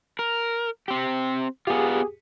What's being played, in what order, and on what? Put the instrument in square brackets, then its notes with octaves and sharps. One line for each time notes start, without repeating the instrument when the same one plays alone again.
[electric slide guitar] A#4
C4 G4
[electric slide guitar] B3 F4 [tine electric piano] G4 G#4